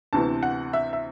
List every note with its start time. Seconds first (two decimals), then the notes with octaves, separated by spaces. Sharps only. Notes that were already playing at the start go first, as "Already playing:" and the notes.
0.13 D2 C3 E3 B3 A5
0.43 F#5
0.73 E5
0.93 E5